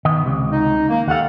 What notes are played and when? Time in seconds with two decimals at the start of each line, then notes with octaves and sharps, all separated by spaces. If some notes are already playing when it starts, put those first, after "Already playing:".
0.05 D#3 B3 D#5
0.25 C#2 C3
0.50 D#4
0.89 D#3 A#3
1.08 D#2 G4 A4 F5 F#5